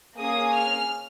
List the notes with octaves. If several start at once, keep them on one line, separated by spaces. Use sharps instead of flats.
A#3 C#4 G#4 D#6
F6